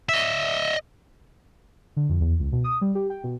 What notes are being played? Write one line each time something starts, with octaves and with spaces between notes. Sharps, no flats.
D#5 E5
D3
F2
E2
C#2
B2
D#6
G3
G4
G5
B2